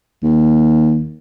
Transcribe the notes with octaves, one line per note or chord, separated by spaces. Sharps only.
D#2